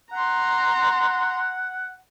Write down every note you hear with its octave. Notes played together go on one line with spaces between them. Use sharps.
F#5 A#5 C6